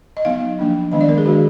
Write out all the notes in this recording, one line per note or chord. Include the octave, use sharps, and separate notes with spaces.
D#5
F#3 B3 D#4 F5
F3 A#3 D4
D#3 G#3 B3 D4 D#5
D5
A#4
G#4
D#3 G#3 D4 F#4